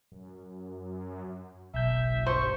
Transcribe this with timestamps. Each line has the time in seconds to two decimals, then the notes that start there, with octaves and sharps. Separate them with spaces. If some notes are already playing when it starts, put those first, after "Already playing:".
0.12 F#2
1.74 F#1 B1 E5 G6
2.26 G2 C5 C#6